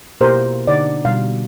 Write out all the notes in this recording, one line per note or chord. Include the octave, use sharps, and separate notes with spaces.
B2 A#3 E4 G4 A#4 C5
D3 D#4 D5 F#5
B2 G3 F5